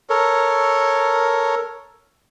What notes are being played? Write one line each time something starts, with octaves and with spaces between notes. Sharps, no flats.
A4 A#4 C#5